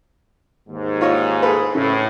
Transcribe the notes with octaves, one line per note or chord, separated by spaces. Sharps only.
D#2 G#2
F4 C#5 D#5
G#4 A4 B4
A2 C#3